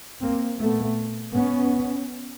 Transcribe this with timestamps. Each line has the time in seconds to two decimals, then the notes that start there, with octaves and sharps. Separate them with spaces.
0.22 A#3 C4
0.60 A#2 A3 B3
1.36 B3 C#4